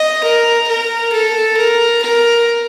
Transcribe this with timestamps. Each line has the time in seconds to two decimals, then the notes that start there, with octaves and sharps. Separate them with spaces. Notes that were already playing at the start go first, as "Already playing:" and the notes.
Already playing: D#5
0.24 A#4
0.68 A#4
1.13 A4
1.58 A#4
2.03 A#4